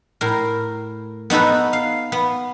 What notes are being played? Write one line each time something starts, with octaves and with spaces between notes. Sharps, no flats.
A2 A#4
B3 D#4 F#4 A4 B4
F5
B3